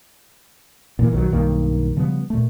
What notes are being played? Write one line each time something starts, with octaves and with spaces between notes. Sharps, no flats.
A#2 E3 A#3
B1 D#3 E3 F#3
B1 G2 D#3 A#3
C#3 F3 G3 B3
A#2 A3